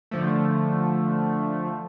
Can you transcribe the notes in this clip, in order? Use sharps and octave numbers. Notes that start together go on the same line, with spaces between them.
D3 F3 A3